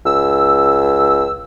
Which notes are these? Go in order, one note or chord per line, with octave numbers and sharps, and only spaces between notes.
C#2 E6